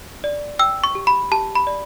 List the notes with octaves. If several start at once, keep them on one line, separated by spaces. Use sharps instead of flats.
D5
G5 E6
C#6
G4
B5
G4 A5
B5
D5